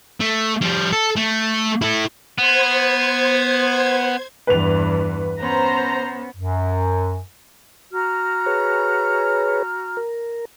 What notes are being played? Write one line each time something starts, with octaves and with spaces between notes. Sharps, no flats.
A3
F3 G3
A4
A3
E4 A4
B3 C5 G#6
E2 G2 B4 F7
B3 C#4 C5 A#5
F#2
F#4 A#5 F6
G#4 B4 C#5
A#4